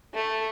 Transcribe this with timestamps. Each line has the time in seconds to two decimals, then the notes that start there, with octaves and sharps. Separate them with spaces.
0.14 A3